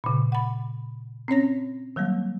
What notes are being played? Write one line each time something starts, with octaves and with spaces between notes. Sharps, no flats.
A#2 C#3
F#5 B5
C4 C#4 C#5 A#6
D#3 F#3 G3 A#3